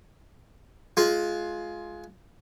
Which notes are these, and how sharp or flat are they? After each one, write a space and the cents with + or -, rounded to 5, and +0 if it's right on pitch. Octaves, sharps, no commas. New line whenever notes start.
G#3 +20 F4 +0